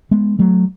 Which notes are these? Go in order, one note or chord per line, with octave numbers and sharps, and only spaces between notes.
G#3 B3
F#3 A3